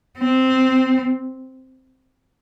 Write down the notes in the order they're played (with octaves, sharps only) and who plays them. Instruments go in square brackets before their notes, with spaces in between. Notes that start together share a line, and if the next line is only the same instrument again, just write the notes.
[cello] C4